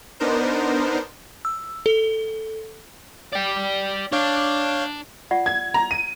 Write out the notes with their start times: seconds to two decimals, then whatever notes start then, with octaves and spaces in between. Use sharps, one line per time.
0.20 B3 D4 D#4 A#4 C5
1.45 E6
1.86 A4
3.33 D5 G5
4.12 D4 C#5 F5 G6
5.31 F4 D5 F#5
5.46 G#6
5.74 A#5
5.91 D#7